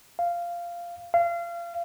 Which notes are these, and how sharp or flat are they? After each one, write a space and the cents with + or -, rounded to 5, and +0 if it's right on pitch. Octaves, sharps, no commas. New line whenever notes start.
F5 -10
F5 -30